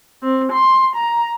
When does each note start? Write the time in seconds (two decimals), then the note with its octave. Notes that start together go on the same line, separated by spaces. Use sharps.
0.23 C4
0.53 C6
0.96 A#5